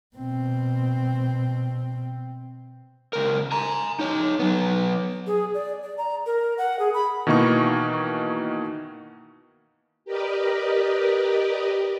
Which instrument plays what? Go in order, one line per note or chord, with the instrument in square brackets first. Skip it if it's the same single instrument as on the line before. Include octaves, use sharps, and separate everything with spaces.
[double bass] B2 C4
[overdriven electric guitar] C#2 A#4
G#5 A#5
D#4 C#5
F#3 B3
[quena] G#4
D5
D5
A#5
A#4
F#5
G#4
B5
[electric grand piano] B2 D#3 E3 A#3 D#4 C#6
[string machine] G4 A#4 B4 D5 D#5